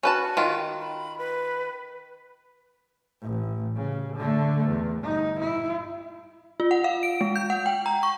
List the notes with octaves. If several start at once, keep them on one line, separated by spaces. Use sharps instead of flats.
C#4 F#4 B4 A5
D#3 F4
B5
B4
A1
C#3
D3 A3
E2
G1 D#4
E4
F4
F#5
F5
D7
G#3
G6
F#5
G5
A#5
C#6